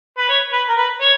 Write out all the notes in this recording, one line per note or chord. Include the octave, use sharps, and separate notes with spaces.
B4
C#5
B4
A#4
B4
C#5